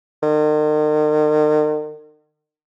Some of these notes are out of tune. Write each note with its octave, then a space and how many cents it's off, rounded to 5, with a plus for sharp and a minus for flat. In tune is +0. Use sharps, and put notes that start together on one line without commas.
D#3 -40